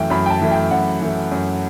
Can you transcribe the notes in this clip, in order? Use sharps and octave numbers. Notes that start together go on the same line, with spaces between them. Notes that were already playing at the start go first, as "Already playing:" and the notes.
Already playing: F#2 E3 A3 G5
F#2 B5
G5
A5
E3 A3
G5
F#2 F#5
E3 A3
F#2